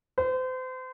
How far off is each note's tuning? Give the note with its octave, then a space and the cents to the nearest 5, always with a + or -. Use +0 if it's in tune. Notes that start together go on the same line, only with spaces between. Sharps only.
C5 -35